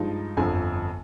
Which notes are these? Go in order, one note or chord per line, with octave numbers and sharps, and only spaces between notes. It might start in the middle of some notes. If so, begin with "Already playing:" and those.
Already playing: G2 F3 G#3 D#4
G1 F2 D3 F3 G#5